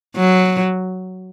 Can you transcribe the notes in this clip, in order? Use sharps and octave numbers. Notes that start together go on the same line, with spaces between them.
F#3